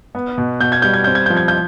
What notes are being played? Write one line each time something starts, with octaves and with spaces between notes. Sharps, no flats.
B3
B2
B2 G6
G#6
G3 G6
G#6
C4 G6
G#6
F3 G6
G#6
G6